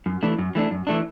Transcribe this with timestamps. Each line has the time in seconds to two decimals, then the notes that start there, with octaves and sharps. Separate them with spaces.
0.06 F#2
0.23 E3 A3 D4
0.38 F#2
0.55 E3 A3 D4
0.71 F#2
0.87 E3 A3 D4